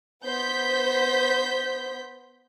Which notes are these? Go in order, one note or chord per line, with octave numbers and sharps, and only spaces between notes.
B3 C5 G6 B6